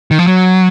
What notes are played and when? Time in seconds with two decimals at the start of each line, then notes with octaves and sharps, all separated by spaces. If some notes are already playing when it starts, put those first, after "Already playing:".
0.11 D#3
0.19 F3
0.27 F#3